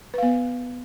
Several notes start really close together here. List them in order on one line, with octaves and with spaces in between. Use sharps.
B4 F5 B3